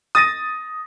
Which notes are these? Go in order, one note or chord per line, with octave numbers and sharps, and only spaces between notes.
D#6 A6 A#6 D#7